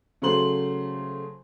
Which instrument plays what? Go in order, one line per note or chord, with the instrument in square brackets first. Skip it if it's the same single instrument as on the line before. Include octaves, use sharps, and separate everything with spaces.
[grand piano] C#3 F#3 A3 C5 C6 F#7